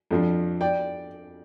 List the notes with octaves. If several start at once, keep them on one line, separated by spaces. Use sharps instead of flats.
F2 F3 D4
D5 G5